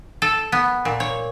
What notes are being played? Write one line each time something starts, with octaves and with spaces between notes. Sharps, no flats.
A4
B3
A#2
C#5